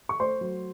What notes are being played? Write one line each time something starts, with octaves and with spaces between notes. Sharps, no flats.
C#6
A3 C5 C6
F#3